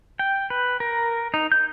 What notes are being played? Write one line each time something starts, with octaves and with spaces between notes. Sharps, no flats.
G5
B4
A#4
D#4
G6